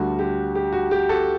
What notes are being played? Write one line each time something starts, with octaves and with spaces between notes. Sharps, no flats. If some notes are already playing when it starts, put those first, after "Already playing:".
Already playing: D2 D3 G3 F#4
G4
G4
F#4
G4
F#4 A4